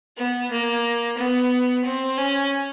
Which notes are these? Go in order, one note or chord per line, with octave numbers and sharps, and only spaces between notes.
B3
A#3
B3
C4
C#4